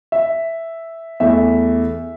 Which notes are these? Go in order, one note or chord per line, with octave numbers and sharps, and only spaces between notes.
E5
E2 E3 A3 E5